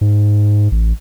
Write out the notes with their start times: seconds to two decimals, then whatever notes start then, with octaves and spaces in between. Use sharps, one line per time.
0.01 G#2
0.72 A1